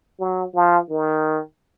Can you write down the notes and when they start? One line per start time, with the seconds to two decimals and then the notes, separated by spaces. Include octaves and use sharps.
0.20 F#3
0.54 F3
0.90 D#3